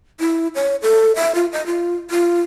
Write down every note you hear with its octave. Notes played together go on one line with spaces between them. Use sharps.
E4
C#5
A4
E5
F4
D#5
F4
F4